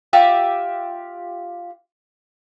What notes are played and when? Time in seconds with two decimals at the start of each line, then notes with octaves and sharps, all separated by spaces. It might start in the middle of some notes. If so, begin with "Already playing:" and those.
0.13 F4 G4 E5